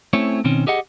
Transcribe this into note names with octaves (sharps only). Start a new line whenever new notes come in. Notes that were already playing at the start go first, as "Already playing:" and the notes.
A3 C4 C#4 E4 C#5
B2 D#3 C4 C#4
G4 G#4 D#5 F#5